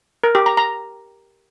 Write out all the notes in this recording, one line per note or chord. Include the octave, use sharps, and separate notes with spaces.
A#4
G4
A#5
A#5